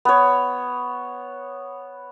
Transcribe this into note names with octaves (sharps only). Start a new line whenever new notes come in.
B3 C#5